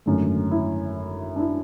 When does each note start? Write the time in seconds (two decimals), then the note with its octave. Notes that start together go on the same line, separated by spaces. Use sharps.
0.06 G#1 F#2 D3 A3
0.51 E4
1.36 D4
1.40 E4